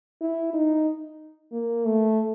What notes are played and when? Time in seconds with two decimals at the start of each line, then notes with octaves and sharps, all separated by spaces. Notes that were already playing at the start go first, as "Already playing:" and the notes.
0.21 E4
0.53 D#4
1.52 A#3
1.85 A3